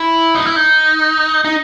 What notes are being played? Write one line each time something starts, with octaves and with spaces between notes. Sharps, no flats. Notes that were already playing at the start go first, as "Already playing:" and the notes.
Already playing: E4
D#4
E4
D#4
D#4